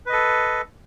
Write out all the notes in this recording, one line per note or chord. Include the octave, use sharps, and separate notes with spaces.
A4 B4 D#5